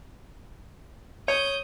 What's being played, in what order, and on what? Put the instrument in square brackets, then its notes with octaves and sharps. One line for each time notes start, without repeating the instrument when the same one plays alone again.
[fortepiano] C#5 [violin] D#6 G6